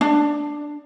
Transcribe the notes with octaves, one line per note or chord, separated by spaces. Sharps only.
D4